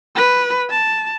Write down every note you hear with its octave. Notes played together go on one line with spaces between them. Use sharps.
B4
A5